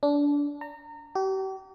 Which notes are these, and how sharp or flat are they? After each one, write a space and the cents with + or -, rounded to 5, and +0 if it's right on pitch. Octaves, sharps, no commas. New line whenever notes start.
D4 -25
A#5 -30
G4 -40